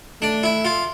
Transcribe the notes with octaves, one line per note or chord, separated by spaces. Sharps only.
A3 D4
E4
F4